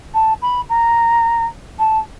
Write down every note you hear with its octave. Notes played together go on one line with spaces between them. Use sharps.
A5
B5
A#5
A5